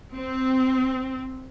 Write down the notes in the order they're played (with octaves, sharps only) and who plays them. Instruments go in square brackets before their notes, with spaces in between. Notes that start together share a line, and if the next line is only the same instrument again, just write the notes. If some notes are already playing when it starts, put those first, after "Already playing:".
[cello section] C4